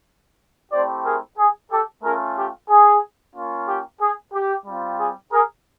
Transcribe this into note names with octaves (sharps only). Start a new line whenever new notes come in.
A3 C4 E4 G4 C5 D5
G#4 A#4
G#4
G4 A4
A3 C#4 F4 G#4 A#4
G4
G#4
A#3 C#4 F4
G4
G#4
G4
G3 C4 F4
G#4
G#4 A#4